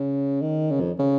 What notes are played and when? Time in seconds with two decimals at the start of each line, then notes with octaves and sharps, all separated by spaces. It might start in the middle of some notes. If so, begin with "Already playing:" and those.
Already playing: C#3
0.41 D#3
0.71 C#3
0.81 F2
0.99 C#3